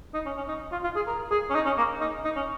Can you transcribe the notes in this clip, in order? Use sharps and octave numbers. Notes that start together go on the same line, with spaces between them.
D#4
C#4
C#4
D#4
F4
F4
G#4
A#4
G#4
C#4
D#4
C#4
A#3
D#4
D#4
C#4